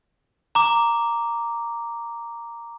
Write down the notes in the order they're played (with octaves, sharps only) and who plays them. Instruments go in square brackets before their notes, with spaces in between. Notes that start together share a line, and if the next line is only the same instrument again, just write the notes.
[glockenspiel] A#5 D6